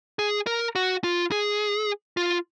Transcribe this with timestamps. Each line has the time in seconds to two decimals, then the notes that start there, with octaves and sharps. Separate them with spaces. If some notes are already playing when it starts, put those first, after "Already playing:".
0.19 G#4
0.47 A#4
0.75 F#4
1.04 F4
1.32 G#4
2.17 F4